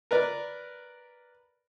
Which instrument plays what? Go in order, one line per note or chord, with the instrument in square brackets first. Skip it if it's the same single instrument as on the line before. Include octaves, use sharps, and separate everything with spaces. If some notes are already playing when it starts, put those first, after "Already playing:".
[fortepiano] A#4 B4 D5